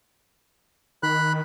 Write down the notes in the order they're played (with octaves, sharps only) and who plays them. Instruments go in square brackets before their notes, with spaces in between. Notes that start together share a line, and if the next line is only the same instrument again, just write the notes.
[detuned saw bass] D#3 [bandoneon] B5 F#6